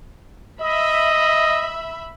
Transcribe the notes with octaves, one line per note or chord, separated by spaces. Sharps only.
D#5 E5 B5